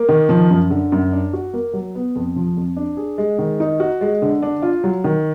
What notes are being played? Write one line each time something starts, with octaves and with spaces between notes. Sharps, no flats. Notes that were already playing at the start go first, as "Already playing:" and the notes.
Already playing: A#3
D#3
F3
F#2
D3
F#2
D4
F#4
A#3
F#3
B3
F2
F3
F2
D4
G#4
G#3
D#3
D#4
F#4
G#3
D3
D4
F4
F#3
D#3